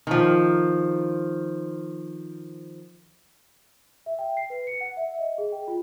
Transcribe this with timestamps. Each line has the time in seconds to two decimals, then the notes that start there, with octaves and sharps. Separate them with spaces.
0.07 D#3 F3
4.06 E5
4.19 G5
4.37 C7
4.50 B4
4.67 C#7
4.81 F#5
4.97 E5
5.19 D#5
5.38 G#4
5.52 G5
5.68 F4